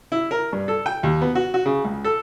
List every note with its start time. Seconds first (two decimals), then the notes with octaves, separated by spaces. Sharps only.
0.12 E4
0.31 A#4
0.53 G2
0.68 A4
0.86 G5
1.03 D#2
1.21 B3
1.35 F#4
1.54 F#4
1.66 C#3
1.85 C#2
2.05 A4